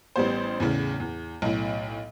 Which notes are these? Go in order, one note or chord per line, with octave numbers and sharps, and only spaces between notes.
A1 G3 B3 C5
E2 A2 C#3
E2
B1 A2